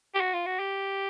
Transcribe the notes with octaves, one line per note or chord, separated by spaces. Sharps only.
G4
F#4
F4
F#4
G4